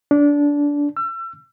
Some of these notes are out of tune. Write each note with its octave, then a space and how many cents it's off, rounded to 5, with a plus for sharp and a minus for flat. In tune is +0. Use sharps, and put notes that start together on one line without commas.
D4 -20
E6 +35